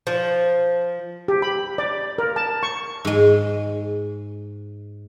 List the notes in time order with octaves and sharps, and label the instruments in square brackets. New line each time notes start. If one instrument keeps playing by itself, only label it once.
[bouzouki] F3
[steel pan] G4
B5
D5
A#4
A5
C#6
[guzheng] G#2 G#3